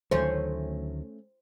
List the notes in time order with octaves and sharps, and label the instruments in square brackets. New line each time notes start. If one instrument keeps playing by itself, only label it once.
[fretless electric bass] D2 D#3 F#3 [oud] A3 C#4 [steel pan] C5